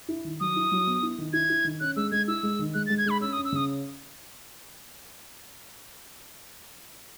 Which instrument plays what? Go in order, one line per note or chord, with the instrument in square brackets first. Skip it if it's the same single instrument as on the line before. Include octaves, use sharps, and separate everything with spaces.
[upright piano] E4
D#3
[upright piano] F#3 [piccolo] D#6
[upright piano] E4
F#3
B3
E4
D#3
[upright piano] E4 [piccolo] G#6
[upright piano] E4
D#3
[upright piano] C#4 [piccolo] F#6
[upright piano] G#3 [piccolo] E6
[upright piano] G#3 [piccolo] G#6
[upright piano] E4 [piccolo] E6
[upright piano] G#3
D#3
[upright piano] G#3 [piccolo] F#6
[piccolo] A6
[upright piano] G#3
[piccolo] G#6
[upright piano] G#3 [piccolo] B5
[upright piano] C#4 [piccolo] E6
[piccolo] D#6
[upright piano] C#4
[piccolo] E6
[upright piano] C#3 [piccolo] D#6